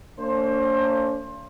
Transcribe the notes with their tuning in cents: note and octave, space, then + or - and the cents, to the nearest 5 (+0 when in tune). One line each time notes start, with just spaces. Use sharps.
A#3 -45 D4 -40 C5 +25